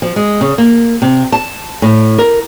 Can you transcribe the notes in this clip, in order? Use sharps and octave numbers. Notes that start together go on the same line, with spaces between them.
F3
G#3
C#3
A#3
C3
A5
A2
A#4